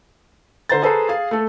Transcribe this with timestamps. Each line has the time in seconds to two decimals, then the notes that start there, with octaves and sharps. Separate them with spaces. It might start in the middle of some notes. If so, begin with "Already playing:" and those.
0.69 D3 C5 A#5 A6
0.83 G#4 A4 B4 C5 A#5
1.09 G#4 F5
1.31 A3 A4